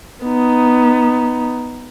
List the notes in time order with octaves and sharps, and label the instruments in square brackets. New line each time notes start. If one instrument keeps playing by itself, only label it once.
[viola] B3 D#4